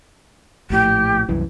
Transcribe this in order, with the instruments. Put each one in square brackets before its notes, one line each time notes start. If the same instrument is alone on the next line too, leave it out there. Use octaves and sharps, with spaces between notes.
[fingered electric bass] A#1 A2 [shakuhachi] G4
[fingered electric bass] C2 F#2 E3